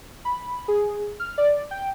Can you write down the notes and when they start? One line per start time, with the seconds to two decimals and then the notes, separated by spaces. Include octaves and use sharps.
0.25 B5
0.68 G#4
1.20 F6
1.38 D5
1.71 G5